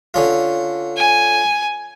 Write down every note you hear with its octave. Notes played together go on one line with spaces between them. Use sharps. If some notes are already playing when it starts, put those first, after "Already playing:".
D3 C#4 F4
G#5